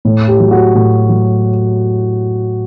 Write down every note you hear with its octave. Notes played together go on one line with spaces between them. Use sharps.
A2
G4
F#3
F#4
A2
F#3